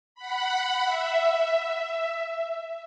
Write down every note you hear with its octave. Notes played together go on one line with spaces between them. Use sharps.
F#5 B5
E5